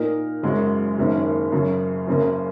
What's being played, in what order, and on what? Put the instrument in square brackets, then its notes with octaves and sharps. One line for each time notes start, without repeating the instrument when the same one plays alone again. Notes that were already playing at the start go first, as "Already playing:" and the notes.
Already playing: [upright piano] A#2 A#3 D#4 A#4
F#1 F#2 C#3 G#3 F#4
F#1 F#2 D#3 A#3 C#4
F#2 C#3 F#3
F#1 F#2 C#3 A#3